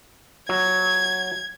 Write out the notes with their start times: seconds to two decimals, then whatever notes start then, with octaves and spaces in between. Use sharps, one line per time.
0.49 F#3 G#6